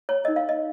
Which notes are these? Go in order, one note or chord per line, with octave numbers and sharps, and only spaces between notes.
C#5
D#4 A#4 C#5 D#5
F5
D#5